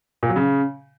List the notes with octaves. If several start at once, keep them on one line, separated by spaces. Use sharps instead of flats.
A#2
F#3
C#3